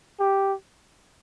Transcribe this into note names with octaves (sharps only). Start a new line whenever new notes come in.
G4